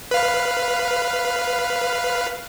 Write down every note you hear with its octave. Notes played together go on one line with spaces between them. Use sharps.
B4 F5